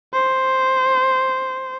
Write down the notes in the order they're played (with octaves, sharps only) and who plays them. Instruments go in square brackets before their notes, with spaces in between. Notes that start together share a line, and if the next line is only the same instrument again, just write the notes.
[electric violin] C5